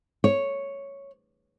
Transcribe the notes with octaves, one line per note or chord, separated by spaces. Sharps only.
C#5